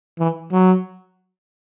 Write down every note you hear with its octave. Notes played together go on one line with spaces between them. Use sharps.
E3
F#3